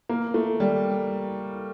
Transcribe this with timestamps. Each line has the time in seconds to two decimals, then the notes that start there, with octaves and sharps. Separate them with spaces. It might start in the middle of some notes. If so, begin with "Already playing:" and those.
0.09 A#3
0.34 A3
0.60 G3